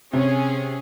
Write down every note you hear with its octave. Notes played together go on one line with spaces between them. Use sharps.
C3 C#4 G#4